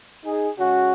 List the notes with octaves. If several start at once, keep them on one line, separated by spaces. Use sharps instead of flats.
D#4 G#4
C#3 G#3 C#4 F#4